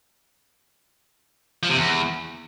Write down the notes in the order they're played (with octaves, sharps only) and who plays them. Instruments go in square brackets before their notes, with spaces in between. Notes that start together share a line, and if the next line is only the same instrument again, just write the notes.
[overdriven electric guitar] F3
C3
E2